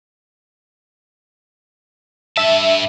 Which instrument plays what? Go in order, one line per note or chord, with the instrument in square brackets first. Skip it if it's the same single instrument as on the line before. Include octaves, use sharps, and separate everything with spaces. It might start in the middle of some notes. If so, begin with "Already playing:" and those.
[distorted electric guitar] G2 A5 [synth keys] E5